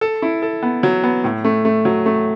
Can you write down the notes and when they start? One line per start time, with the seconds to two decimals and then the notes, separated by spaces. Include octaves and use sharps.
0.01 A4
0.22 E4
0.42 A4
0.63 B3
0.83 F#3
1.04 B3
1.24 A2
1.44 A3
1.65 A3
1.85 F#3
2.06 A3